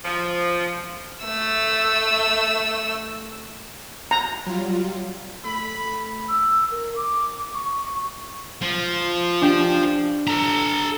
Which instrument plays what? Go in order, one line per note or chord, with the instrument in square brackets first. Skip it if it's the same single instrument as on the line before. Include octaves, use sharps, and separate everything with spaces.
[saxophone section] F3
[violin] A3 E6
[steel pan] A#5
[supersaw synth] F#3 G3 F4
[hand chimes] A3 A4 E6 [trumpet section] B5
[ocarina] E6
A#4
D6
C#6
[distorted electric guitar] F3
[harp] D4 G4
[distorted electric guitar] A4 A#5